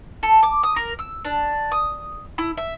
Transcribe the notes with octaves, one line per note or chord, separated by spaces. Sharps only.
A4
D6
D#6
A#4
E6
D4
D#6
E4
E5